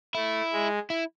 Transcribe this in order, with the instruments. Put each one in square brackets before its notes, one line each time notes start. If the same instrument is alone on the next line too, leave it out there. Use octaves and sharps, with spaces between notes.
[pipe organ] A3 [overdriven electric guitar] E4
[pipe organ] G#3
[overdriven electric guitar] E4